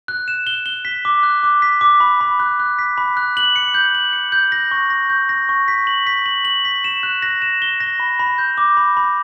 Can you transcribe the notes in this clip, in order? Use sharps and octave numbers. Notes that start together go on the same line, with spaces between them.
F#6
E7
G7
G7
B6
D6
F#6
D6
B6
D6
B5
B5
F#6
F#6
B6
B5
F#6
F#7
C#7
G6
F#7
C#7
G6
A#6
C#6
A#6
G6
A#6
C#6
B6
F#7
B6
F#7
F#7
B6
E7
F#6
A#6
E7
G7
A#6
B5
B5
G6
D6
B5
B5